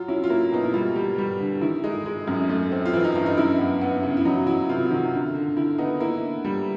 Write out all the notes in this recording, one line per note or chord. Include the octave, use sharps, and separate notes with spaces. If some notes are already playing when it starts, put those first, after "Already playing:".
Already playing: F#3 F4
C#4 E4
F4
A#3 E4
B2 D#4
E4
G3 F4
G3
G3
D3
D#3 E4
G#3 D#4
G#3
F#2
A3
C4
F4
E3 E4
D#4
G2 D#4
D#4
F#2 E4
B3
B3
C#3
E4
F#3 D#4
F#3 E4
C3 F4
D#3
D3
D3
D3 E4
B3 D#4
A#3 E4
D3
G3